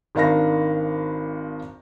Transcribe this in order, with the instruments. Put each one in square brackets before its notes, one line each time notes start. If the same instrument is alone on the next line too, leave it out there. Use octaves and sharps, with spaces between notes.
[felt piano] G#1 D#3 D4 F5 B5 A#6